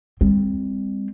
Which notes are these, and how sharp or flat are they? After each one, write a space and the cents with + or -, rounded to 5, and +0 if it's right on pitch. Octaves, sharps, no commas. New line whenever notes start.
G3 +40 C4 +0